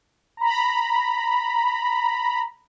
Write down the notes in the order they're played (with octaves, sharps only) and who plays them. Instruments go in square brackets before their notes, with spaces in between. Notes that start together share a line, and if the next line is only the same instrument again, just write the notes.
[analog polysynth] A#5 B5